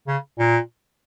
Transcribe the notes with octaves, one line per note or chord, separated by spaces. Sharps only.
C#3
A#2